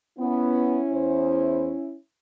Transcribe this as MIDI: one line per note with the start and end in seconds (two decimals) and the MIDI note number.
0.19 0.79 59
0.19 1.95 61
0.19 1.95 64
0.93 1.72 40
0.93 1.72 72